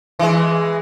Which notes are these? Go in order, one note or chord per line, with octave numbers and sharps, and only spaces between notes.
E3 G#3